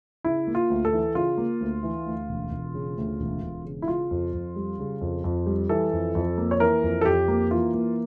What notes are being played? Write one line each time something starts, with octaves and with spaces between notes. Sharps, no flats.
C#3 E4
A#3
F4
D2
A4
E3
C#3 F4
A#3
D2
E3
D2
E1
E1
C#3
D2
E1
E1
C#3
E4
C#3 F4
F2
F2
G3
C#3
F2
F2
G3
E3 A4
F2
F2
A#3
C#5
E3 A#4
F2
A4
F2 G4
A#3
E3 F4
A#3